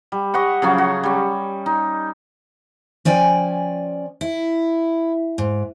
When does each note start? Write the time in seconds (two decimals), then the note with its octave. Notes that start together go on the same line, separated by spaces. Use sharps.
0.12 G3
0.34 G3 D#5 F#5 C#6
0.62 C#3 F3 F#3 C#4
0.78 F#4
1.03 G3 C#4
1.66 D#4
3.05 F3 C#4 D5 G5 G#5
4.21 E4
5.38 G#2